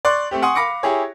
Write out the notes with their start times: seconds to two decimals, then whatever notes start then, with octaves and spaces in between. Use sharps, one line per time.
0.05 D5 C6 C#6 F#6
0.31 A3 C4 G4
0.43 F#5 G#5 C6 C#6 D#6
0.55 F5 B5 D6 A#6 C#7
0.83 E4 G4 G#4 C#5